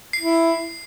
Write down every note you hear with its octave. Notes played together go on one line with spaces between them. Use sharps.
C7
E4